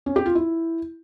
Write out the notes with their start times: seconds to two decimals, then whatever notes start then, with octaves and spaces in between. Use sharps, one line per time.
0.06 C#4
0.16 G4
0.26 F4
0.35 E4